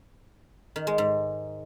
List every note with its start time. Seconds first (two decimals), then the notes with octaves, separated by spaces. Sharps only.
0.76 D#3
0.87 G#3
0.98 G#2